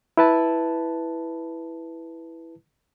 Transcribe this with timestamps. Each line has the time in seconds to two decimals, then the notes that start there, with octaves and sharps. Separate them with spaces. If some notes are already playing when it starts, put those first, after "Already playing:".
0.17 E4 B4 A5